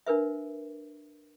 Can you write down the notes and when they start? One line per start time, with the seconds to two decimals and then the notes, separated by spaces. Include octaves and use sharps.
0.07 D4 A#4 B4 E5